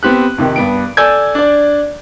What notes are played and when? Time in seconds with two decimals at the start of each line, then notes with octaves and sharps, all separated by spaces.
0.03 B3 C4 G4 F#6
0.38 F2 C3 D#3
0.56 G2 B3 D7
0.97 A4 D5 G#5 E6 G6 G#6
1.35 D4 D5